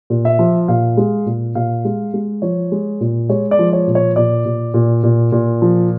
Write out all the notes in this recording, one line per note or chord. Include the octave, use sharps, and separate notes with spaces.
A#2
E5
F3
A#2 F5
G#3
A#2
A#2 F5
G#3
G#3
F3 C#5
G#3
A#2
G#3 C#5
D5
F3
C#5
A#2
C#5
A#2 D5
A#2
A#2
A#2
A#2
F3